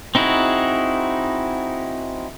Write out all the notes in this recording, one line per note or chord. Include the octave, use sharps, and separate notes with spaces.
C4 D#4 E4 F#4 G#4